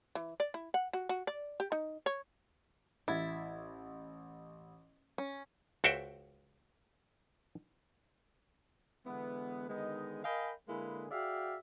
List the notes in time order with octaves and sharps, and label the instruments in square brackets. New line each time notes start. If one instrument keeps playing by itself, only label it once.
[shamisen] E3
D5
E4
F#5
F#4
F#4
D5
G4
D#4
C#5
[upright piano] A1 G#6 A6 [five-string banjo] E4
[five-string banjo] C#4
[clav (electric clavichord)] C#2 F#4 C5 E5 G5
[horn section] D3 E3 G#3 B3
D3 D#3 G#3 B3 D#4 D#5
A#4 D#5 F5 G5 G#5 B5
D3 G#3 A#3 E4 G#4 B4
F#4 G#4 D5 E5 F5 G5